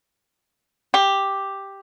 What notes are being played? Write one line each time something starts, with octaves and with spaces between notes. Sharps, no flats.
G4